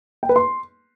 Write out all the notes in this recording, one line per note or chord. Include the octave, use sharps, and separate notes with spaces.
G5
B4
C6